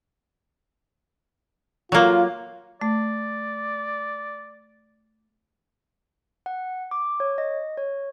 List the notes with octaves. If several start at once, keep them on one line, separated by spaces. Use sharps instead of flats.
F#3 A#3 F4
A3 D5
F#5
D6
C#5
D#5
C#5